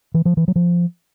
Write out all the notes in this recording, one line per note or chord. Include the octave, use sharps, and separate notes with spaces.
E3
F3
E3
F#3
F3